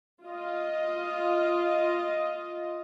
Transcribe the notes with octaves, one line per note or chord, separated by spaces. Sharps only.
F4 D#5